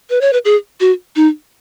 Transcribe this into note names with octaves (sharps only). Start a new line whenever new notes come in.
B4
C#5
B4
G#4
F#4
D#4